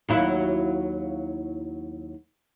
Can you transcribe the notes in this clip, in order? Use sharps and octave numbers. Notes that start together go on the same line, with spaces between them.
D#2 F#3 E4